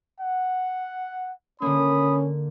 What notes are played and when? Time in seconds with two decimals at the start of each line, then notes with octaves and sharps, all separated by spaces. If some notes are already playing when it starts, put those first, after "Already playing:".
0.20 F#5
1.62 D3 A#3 C#4 B5 D#6